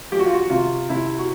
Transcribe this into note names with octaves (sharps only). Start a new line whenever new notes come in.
F3 G4
F#4
F4
F#4
C3 F4
C3 E4
F#4